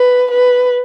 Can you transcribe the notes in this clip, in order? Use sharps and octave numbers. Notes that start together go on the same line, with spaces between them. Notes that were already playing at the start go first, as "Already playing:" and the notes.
Already playing: B4
B4